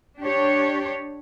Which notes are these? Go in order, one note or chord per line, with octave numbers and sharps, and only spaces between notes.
D4 G4 C#5